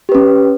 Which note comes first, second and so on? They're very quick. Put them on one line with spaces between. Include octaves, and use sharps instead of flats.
G4 B4 C#4